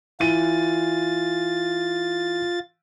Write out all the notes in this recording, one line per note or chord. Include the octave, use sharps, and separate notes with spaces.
E3 F4 A6 D#7